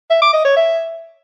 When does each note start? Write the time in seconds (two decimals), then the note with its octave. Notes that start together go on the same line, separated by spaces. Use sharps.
0.10 E5
0.22 D6
0.33 D#5
0.45 C#5
0.57 E5